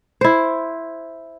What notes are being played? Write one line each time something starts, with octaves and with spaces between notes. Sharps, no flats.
E4 C5